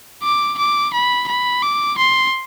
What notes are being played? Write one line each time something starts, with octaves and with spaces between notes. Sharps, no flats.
D6
D6
B5
B5
D6
C6